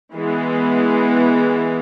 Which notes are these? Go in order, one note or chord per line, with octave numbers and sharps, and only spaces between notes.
E3 G#3 B3